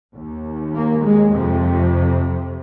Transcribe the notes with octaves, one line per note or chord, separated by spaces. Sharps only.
D#2
A#3
G#3
F2 C3 F3